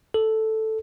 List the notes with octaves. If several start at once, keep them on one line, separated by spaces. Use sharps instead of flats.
A4